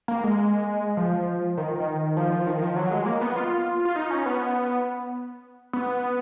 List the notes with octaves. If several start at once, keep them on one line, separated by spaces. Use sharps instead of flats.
A#3
G#3
F3
D#3
D#3
F3
F3
D#3
F3
F#3
G#3
A#3
B3
F4
F4
D#4
C#4
B3
B3